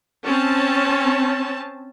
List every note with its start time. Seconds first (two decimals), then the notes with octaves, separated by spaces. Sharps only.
0.24 C4 C#4 A5